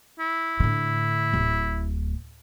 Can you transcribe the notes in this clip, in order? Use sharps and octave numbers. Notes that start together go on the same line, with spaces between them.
E4
A2 D3
D1